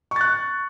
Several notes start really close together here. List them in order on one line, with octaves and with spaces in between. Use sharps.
C#6 A6 F#6